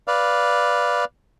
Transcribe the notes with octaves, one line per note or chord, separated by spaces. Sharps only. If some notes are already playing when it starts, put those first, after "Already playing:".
B4 D5 F5